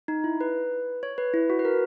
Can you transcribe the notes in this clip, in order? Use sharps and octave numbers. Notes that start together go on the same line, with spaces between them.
D#4
E4
B4
C#5
B4
E4
F#4
B4
A#4